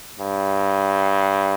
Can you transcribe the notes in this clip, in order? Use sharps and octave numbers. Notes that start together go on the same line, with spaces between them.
G2